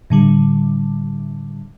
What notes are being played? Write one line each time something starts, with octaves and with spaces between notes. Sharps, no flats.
A2 D3 G3